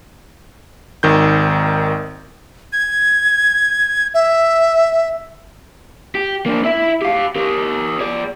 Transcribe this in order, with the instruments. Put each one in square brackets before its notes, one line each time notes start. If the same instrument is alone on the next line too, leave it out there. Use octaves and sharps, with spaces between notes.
[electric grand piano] G#1 D#3 G6
[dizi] G#6
E5
[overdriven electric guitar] G4
A#3 D4
E4 E5
G4 F5
G4 A#4
G#4 D5